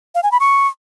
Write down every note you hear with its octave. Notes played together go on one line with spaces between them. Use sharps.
F5
G#5
B5
C#6